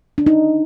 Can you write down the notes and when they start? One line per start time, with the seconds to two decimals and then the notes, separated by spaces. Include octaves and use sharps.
0.18 D4
0.26 D#4